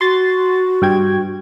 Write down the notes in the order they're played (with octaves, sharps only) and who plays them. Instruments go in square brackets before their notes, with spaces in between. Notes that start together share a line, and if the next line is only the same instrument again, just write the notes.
[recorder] F#4 [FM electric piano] C6 A6
[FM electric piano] G2 G5 G#6